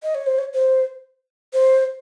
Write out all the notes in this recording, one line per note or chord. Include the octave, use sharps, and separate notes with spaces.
D#5
C#5
C5
C#5
C5
C5